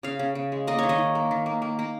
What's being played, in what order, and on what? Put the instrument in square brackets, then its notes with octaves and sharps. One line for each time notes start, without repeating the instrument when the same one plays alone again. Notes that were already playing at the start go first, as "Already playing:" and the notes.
[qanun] C#3 F5
C#3
C#3
G#3
A#3 D#5
D#3 C#5
D#5
D#3
A#3
D#3
A#3
A#3
A#3